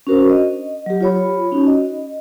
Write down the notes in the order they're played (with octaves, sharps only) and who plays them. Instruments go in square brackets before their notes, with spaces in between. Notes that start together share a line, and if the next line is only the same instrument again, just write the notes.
[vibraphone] C#4 D4 F#4 A#4 C5
D#5
F#3 G4
F4 C#5 B5
C#4 D#4 F#4
D#5